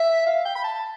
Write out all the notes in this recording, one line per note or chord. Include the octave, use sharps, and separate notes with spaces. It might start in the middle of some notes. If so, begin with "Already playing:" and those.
Already playing: E5
F5
G5
B5
A5